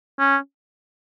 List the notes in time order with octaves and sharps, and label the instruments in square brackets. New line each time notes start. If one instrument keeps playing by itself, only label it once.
[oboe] C#4